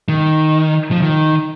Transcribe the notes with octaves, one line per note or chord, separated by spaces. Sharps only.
D#3
F3
D#3